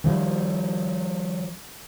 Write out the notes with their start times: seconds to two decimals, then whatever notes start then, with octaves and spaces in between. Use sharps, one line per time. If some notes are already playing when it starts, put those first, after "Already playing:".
0.04 D#3 F3 G3